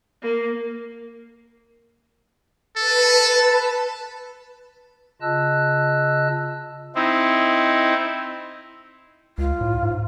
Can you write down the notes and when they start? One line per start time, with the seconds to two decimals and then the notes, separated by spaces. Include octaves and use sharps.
0.22 A#3
2.77 A4 B4 A5
5.22 C#3 F4 D#5 A5 E6 F#6
6.95 C4 D#4 E4
9.38 C#2 F4
9.61 A2
9.83 G#2